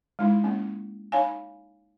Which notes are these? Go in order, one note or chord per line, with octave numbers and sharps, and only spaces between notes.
G#3 D#4 E4
A#3 C#4
D#4 C#5 F5 G#5